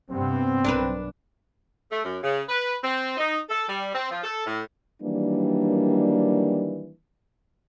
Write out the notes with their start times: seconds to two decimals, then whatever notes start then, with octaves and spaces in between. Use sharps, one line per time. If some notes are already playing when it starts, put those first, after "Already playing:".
0.10 G2 C3 B3 C4
0.64 B1 D4 A#4 B4
1.91 A3
2.04 F#2
2.22 C#3
2.48 B4
2.82 C4
3.17 D#4
3.49 A4
3.67 G3
3.94 C4
4.10 F3
4.23 A4
4.45 A2
5.03 D#3 E3 F#3 G3 A#3 D4